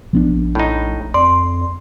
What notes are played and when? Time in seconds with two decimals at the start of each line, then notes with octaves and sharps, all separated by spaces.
0.13 A#1 F3 B3 D4
0.55 A2 D#4
1.14 F2 D5 C6